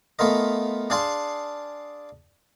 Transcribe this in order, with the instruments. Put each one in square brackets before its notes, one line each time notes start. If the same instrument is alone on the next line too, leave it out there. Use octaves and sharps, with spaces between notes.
[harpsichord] A3 B3 F4 A#4 D#5
D4 G#4 F5 G#5 A5 C6